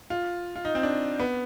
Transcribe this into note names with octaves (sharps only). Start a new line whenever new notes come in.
F4
F4
D#4
C4
D4
B3